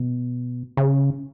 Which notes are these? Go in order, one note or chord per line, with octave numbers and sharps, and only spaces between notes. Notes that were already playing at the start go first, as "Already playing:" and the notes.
Already playing: B2
C#3